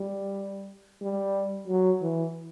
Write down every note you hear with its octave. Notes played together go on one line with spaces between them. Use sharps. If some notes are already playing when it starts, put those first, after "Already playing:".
Already playing: G3
G3
F#3
E3